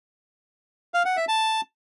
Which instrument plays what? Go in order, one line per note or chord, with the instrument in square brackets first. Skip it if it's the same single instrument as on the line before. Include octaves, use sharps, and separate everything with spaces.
[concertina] F5
F#5
E5
A5